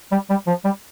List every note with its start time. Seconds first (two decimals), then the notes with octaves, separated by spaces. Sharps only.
0.12 G3
0.30 G3
0.47 F3
0.64 G3